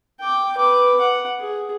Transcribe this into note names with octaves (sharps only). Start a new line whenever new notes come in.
G5 D6
B4 D6
F#5
G#4